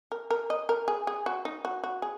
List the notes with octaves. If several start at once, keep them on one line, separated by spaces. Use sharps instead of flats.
A#4
A#4
D#5
A#4
G#4
G#4
F#4
D#4
F#4
F#4
G#4